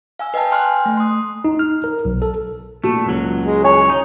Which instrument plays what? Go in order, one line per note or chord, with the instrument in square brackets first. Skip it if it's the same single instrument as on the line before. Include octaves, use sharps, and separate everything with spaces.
[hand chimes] F5 G#5 E6
B4 D#5 F5 G5 A5
G5 G#5 C6 F6 F#6
A3
C6 D#6
[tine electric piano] D#4
F6
A#4
B1
A4
[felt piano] A#2 F#4 [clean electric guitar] A3
[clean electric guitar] C#2 F#3
[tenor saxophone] G#3
[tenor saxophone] C#5 [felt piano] G#5
[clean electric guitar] D#4